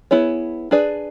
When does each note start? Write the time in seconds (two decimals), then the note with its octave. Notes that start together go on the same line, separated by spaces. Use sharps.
0.11 B3 E4 G#4 C#5
0.71 D4 G#4 B4 D5